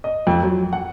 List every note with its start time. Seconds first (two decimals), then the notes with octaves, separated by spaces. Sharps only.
0.04 D#5
0.27 F2
0.43 F#3
0.73 F#5